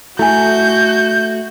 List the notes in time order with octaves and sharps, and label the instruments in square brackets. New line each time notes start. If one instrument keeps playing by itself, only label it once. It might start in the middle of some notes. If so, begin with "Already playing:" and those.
[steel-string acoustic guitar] A3 [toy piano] E4 G#5 [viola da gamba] F#4 [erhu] G6